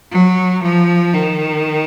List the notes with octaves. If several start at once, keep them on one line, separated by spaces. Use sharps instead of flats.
F#3
F3
D#3